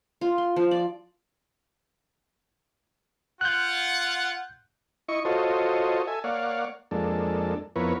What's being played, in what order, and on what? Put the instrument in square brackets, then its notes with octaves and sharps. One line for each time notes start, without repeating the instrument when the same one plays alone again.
[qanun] F4
C6
F3
D5
[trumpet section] F4 F#5 [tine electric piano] F#6 G6
[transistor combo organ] E4 D#5 C#6
F4 F#4 A4 C5 C#5 D#5
A4 E5 G#5
A#3 C#5 D5 F5 F#5
F2 G#3 A#3 D4 A4
F2 B3 E4 A#4 B4 C#5